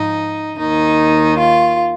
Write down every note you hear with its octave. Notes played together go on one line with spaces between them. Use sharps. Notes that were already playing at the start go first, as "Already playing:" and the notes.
Already playing: G#2 F3 D#4
D#2 D#3 D#4
F4